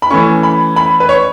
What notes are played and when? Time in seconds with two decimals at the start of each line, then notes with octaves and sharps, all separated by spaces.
0.02 B5
0.10 E3 A3 C#4 C#6
0.43 B5
0.76 B5
1.00 B4
1.09 C#5